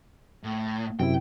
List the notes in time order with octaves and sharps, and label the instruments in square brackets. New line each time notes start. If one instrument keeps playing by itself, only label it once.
[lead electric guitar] A2
[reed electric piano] F#2 C3 E4 [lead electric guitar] G5